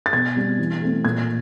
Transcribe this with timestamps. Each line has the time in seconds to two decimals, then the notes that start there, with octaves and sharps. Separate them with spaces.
0.06 A6
0.13 B2 G#6
0.36 G3 C4
0.59 E3
0.81 A3 C4
1.04 A#2 G#6